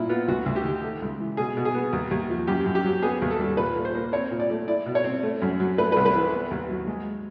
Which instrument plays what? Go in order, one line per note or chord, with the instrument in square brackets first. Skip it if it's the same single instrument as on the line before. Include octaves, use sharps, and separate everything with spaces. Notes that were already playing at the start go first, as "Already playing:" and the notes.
Already playing: [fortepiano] A#2 E4
B3 F4
D2 F#4
D2
G4
D#3
A3
C#2
E3
B2 G#4
B2
G#4
B3
D#2
D#2
F3
F#2 G4
F#2
G4
F#3
B3 G#4
D#2
A4
G3
A#2 B4
A#2
C5
A#3
C4 C#5
A#2
D5
A3
E4 D5
B2
C#5
C4
A3
F#2
F#3
A3 B4
B4
C2
B4
E3
B3
D#2
F#3
G#3